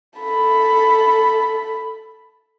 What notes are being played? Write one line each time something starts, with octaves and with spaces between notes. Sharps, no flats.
A4 B5